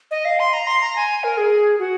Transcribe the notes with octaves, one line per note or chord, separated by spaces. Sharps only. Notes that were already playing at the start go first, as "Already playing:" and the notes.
D#5
F5
C6
A#5
C6
A#5
G#5
A#4
G#4
F#4